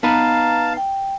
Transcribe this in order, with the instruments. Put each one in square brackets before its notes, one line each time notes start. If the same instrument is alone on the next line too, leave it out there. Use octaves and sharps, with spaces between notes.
[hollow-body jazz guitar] B3 D#4 B4 [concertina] F5 A5 [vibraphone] A#5
[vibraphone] G5